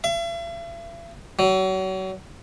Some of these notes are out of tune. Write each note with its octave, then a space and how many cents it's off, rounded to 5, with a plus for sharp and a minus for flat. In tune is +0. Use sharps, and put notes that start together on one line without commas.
E5 +45
F#3 +35